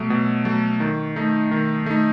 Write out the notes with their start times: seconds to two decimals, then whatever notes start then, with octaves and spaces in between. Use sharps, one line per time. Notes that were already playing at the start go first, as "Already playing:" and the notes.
Already playing: B2 F#3 A3
0.10 B2
0.45 F#3 A3
0.80 D#3
1.16 A3 D#4
1.51 D#3
1.86 A3 D#4